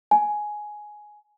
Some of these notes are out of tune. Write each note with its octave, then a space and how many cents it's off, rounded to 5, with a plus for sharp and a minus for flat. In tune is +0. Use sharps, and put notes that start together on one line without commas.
G#5 +10